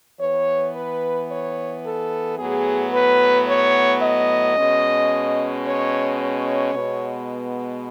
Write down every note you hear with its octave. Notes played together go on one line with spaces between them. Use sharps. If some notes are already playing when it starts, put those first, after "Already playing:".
E3 B3 C#5
B4
C#5
A4
A2 F#3 B3 G#4
B4
C#5
D#5
B2 G#3 C#4
C#5
C#5
B2 G#3 B3